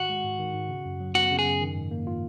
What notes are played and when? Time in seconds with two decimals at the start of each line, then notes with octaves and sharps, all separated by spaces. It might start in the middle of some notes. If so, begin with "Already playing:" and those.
Already playing: G#2 D#3 F#4
0.10 G#3
0.24 G#2
0.39 D#3
0.54 G#2
0.69 C#3
0.85 F#2
1.00 F#3
1.15 B3 F#4
1.31 C#3
1.39 G#4
1.46 F#2
1.61 D#3
1.76 G#2
1.91 A#3
2.07 F4